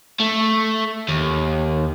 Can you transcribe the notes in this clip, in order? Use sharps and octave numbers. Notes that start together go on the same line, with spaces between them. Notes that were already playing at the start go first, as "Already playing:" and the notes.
A3
D#2